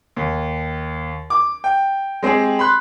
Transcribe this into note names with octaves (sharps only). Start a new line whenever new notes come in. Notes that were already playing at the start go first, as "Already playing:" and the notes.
D#2
D6
G5
G#3 C4 G4 G#4
B5 C6 F#6